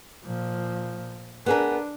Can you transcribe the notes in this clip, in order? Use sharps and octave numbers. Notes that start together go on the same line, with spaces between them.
A#2 F3
B3 D4 G#4 A#4